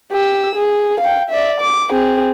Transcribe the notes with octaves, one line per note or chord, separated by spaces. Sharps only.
G4 E6
G#4
F5 G5
D5 E5
D6
C4 G#4